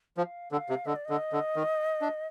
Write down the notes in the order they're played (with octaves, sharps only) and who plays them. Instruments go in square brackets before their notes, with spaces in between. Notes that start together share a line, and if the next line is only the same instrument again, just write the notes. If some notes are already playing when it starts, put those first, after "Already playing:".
[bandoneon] F3 [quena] G5
[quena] F5
[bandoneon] D3 [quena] G5
[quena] F5
[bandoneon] C3
[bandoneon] D3 [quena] D#5
[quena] D5
[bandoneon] D3 [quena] D#5
[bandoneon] D3
D#3
D4